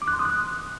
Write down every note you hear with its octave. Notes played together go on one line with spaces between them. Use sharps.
D6
F#6
C6
D#6
F#6